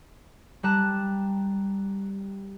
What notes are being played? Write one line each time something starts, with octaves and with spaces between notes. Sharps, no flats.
G3 A5 A#5 F#6 E7